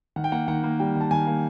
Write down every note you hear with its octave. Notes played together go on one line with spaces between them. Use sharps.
D#3 F#5
G5
A#3 F#5
D#3 F#5
A#3
G3 G5
D#3
A5
D#3 G#5
A#3